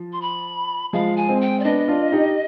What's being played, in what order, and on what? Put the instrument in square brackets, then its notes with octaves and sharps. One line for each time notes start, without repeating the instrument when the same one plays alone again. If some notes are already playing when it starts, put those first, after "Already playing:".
Already playing: [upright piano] F3
[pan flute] C6
B5
[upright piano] F3 G#3 [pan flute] F5
[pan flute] G#5
[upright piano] G#3 C4
[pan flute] G5
D5
[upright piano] B3 D4 [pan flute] D#5
[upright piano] D4 F4
D#4 G4